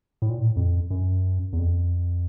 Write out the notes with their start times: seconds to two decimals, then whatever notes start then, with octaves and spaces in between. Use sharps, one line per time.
0.22 A2
0.29 A#2
0.39 A2
0.56 F2
0.90 F#2
1.53 E2
1.59 F2